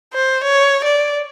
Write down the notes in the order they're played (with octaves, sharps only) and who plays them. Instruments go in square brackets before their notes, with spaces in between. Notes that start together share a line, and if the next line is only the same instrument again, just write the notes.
[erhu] C5
C#5
D5